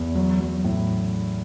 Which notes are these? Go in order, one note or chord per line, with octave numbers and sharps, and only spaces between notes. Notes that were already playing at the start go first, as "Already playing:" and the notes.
Already playing: E2
F#3
F#3
A2